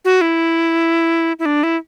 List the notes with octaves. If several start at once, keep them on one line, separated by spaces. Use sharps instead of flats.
F#4
E4
E4
D4
E4